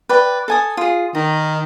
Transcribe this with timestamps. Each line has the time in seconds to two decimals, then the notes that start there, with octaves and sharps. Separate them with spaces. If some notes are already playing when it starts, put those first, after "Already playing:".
0.09 B4 D5 G5
0.48 A4 G#5 D#6
0.77 F4 G#4
1.15 D#3 D#5